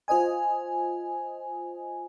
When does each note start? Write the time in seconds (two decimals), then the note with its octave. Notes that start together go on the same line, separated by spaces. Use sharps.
0.08 F4 C5 D#5 G#5